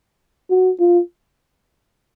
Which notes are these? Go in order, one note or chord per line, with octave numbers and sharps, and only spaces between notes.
F#4
F4